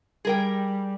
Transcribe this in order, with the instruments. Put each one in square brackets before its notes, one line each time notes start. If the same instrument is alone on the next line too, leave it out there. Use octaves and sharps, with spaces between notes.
[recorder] G3 [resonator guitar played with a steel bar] G#4 A#4 G5